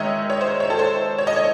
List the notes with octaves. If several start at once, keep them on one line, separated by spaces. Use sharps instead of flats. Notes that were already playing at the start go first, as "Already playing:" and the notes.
Already playing: D#3 G#3 D#4 C#5 D#5 E5
C#5
C5
C#5
A4
C5
C#5
D#5
C#5